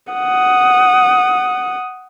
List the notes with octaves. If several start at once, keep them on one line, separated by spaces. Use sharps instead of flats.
F#5 D#6